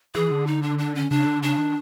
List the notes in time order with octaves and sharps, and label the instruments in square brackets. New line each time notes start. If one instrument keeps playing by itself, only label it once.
[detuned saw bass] E3 [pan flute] G#4
[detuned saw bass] D3
[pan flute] D#4
D4
D4
C#4
[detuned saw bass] C#3 [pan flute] D4
[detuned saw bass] D3
[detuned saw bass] C#3 [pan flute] D4
[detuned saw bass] D#3